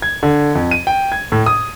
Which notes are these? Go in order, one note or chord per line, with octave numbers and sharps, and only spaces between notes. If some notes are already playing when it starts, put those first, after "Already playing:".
G#6
D3
F2
D#7
G5
G#6
A2
D#6